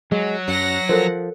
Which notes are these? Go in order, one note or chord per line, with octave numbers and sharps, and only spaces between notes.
F#3 G#3
F#2 F#5 A#6
F3 A4 A#4 C5